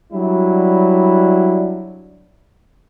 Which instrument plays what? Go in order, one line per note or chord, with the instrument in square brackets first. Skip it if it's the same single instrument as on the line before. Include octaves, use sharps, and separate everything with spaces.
[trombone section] F#3 G3 D4 E4